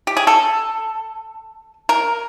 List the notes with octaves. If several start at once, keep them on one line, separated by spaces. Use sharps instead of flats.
G4
G#4
A4
A#4